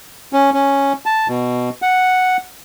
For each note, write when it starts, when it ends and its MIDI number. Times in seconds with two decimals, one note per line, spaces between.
0.33 0.50 61
0.54 0.93 61
1.06 1.28 81
1.28 1.69 47
1.82 2.37 78